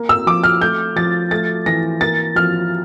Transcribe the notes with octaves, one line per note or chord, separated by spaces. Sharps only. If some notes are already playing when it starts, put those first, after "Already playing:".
Already playing: A#3
E6
F3 D6
F6
A3 G6
F3 A6
A3 A6
E3 A#6
A#3 A6
F3 F6